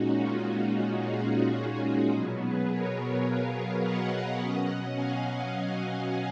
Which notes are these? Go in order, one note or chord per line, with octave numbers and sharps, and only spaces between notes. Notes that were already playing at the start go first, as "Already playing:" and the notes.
Already playing: A#2 G#3 C#4 D#4 F#4
F4
D#4 F#4
F4 G#4
B2 F#3 B3
G#4 B4
A#4 C#5
C#5 F5
D#5 F#5
B2 F#3 C#4
F5 G#5
D#5 F#5